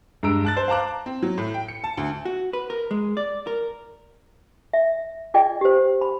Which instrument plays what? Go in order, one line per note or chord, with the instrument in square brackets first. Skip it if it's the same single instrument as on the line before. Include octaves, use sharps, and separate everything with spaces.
[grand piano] G2 G#3 A#5 E6 D7
A5 F#6 A6
C5
F5 A5 A#5 D6 F#6
[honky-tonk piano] C4
F#3
A2
G5
C#7
A5
D2
[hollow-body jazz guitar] F#4
B4
A#4
G#3
D5
A#4
[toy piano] E5
F4 G#4 D5 D#5 G5
G4 C5
B5